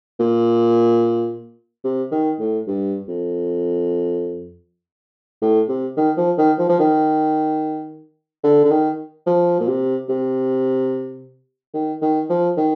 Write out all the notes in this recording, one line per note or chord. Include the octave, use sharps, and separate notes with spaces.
A#2
C3
D#3
A2
G2
F2
A2
C3
D#3
F3
D#3
F3
F3
D#3
D3
D3
D#3
F3
A#2
C3
C3
D#3
D#3
F3
D#3